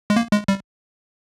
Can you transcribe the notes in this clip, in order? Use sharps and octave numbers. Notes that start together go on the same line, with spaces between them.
G#3
A#3
G#3
G3